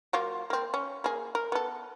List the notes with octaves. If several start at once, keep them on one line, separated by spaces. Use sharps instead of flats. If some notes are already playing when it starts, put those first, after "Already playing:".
F#3 A#3 F4
A#3 C4
C#4
A#3 G#4
A#4
B3 A4